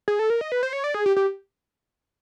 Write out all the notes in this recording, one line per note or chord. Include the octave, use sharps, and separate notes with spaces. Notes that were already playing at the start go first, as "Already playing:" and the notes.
G#4
A4
A#4
D#5
B4
C5
C#5
D5
G#4
G4
G4